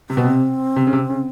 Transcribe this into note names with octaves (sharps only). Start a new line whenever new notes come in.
C3 C4
B2
C3
C3
C#3
C3
C#3